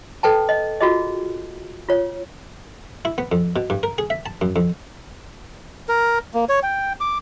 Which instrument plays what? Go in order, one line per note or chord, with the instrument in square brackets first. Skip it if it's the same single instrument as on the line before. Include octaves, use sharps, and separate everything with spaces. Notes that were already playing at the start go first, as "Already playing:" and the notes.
[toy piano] A4 B4 G5 A5
D#5
F4 F#4 G#4 D#5
F4 C#5
[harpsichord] E4
B3
F2
B2
G2
A#4
G#4
E5
A5
F#2
F2
[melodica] A#4
A#3
C#5
G5
D6